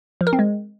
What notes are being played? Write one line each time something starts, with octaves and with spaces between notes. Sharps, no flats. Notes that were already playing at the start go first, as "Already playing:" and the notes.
F3
A#4
C4
G#3